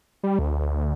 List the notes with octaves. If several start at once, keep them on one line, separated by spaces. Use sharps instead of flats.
G3
D2